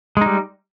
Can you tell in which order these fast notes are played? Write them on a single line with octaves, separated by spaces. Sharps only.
G#3 D#4 G3